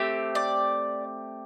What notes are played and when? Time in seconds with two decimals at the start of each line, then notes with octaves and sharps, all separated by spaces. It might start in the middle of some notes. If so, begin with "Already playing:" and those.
Already playing: A3 C4 G4
0.35 D5